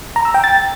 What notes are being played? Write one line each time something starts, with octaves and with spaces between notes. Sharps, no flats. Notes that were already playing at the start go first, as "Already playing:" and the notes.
A#5
E6
G5
A6